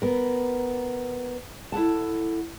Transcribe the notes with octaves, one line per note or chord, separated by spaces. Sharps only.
B3 A#4
E4 A4 F#5 A5